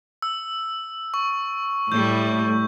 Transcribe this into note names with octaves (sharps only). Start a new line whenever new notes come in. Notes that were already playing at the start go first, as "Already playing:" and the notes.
E6
C#6
A2 G3 A3 G6